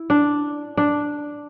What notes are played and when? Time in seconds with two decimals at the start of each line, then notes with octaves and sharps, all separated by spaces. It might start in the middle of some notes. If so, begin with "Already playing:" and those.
Already playing: E4
0.10 D4
0.77 D4